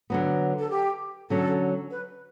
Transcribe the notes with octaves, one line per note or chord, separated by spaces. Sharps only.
D3 F#3 B3
A4
G4
D3 F#3 C#4 A4
B4